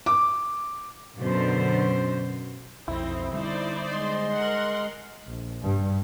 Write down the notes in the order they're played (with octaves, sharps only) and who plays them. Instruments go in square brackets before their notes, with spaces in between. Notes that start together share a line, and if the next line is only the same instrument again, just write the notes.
[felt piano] D6
[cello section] F#2 B2 D3 C5
[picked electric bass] B1 F2 [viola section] C4 D#4 [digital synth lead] E4
[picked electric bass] D3 G3 [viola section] D#4 C5 D5
[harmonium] G#3 D#5 [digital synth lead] C6
[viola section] A#4 F#5
[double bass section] A#1
G2